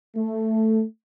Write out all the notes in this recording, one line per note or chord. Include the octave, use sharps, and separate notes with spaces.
A3